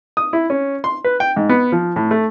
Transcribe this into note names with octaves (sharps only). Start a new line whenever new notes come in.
D#6
E4
C#4
C6
B4
G5
G#2
B3
F3
A2
A3